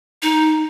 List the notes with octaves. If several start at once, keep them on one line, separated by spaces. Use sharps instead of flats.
D#4